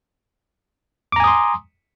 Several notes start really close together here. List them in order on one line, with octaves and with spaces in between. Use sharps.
D6 A#5 G#5 D#6 C6